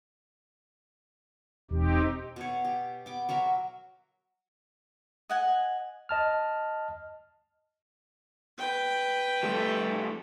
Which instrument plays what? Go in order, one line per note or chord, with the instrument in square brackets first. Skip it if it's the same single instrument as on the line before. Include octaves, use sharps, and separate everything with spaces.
[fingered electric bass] E1 [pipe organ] C4 D#4 G4
[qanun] B2 C#5
G4
B3 D6
F#3 F#4 A#4 E5
[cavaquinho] D#5 F#5 G#5
[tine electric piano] D#5 A5 F6
[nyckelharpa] B4 G5
[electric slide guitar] F3 G3 A3